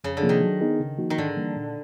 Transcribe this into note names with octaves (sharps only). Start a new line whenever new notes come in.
F2 C#3
D3
C3 F3 A#3
D#3
F#3
B3 D#4 G#4
C#3
F3 A#3 D#4 F#4
D#3
G#2 D3
E3 G3 A#3
A#2